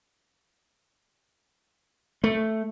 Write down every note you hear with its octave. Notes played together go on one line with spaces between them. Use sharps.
A3